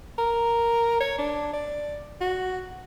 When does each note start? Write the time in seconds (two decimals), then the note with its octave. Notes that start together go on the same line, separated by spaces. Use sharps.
0.18 A#4
1.00 C#5
1.18 D4
1.53 D5
2.21 F#4